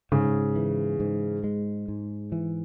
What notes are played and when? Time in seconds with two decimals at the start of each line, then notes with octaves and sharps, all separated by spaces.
0.12 G#2 C#3
0.56 E3
1.00 G#2
1.44 G#3
1.88 G#2
2.32 E3